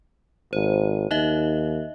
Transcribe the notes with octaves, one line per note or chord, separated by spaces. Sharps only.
G#1 C5
D#2 D#4 D#5 E5